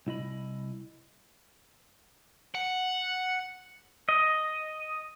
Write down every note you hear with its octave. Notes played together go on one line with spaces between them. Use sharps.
C2 E4 D#5 B5
F#5
D#5